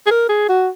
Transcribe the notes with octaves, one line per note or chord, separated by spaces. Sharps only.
G#4
A#4
G#4
F#4